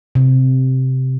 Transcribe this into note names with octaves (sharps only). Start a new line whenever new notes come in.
C3